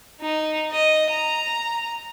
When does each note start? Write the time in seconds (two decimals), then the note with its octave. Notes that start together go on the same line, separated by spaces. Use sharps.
0.21 D#4
0.72 D#5
1.11 A#5